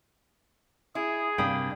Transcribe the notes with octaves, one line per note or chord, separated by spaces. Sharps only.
E4 G#4
G2 C3 A#3 D4 G5 B5 D#6